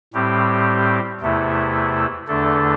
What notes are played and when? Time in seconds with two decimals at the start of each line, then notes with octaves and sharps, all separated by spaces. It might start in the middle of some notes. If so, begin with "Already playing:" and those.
0.13 A2 G3 C4 G4
1.20 E2 C3 A3 E4
2.27 E2 D3 A3 D4 A4